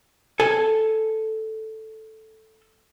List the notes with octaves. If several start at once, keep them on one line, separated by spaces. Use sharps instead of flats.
A4 G#5